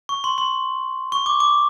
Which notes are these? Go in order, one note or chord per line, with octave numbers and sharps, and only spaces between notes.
C#6
C6
C6
C#6
D6
D6